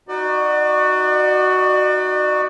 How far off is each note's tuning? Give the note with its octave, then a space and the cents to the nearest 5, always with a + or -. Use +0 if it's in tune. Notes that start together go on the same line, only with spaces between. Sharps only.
D#4 +5 F#4 +5 D5 +35